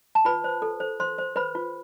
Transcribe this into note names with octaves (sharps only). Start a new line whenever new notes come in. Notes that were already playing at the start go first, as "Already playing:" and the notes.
A5
F4 B4 B5
C5
A4
C5
C5 C6
C5
B4 C5 B5
F4